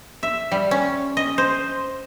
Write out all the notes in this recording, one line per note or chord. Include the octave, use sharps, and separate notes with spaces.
E5
G3
C#4
D#5
C5